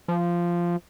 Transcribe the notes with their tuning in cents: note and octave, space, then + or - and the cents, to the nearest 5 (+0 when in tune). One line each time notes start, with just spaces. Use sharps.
F3 -10